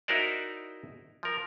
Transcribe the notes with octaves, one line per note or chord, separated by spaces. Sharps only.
D#4 E4 F#4 A#4 C5 D5
F3 A#4